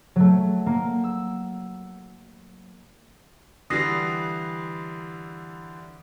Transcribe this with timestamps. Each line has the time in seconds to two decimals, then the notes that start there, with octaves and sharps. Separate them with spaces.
0.16 F#3 A3
0.66 A#3
1.04 E6
3.70 D3 E3 G3 D#6 A#6 C7